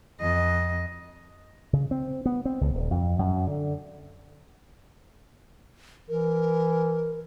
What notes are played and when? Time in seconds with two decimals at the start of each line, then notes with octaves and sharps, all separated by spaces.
0.20 F2 D#5
1.73 C#3
1.91 C4
2.26 B3
2.45 C4
2.61 C#2
2.74 D#1
2.91 F2
3.19 F#2
3.47 D3
6.09 E3 A#4